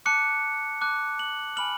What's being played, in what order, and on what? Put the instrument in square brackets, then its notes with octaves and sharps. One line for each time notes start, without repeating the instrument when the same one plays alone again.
[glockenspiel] A5 D6 F#6 C#7
A5 D6 F#6
F#7
G#5 B5 F6 F#7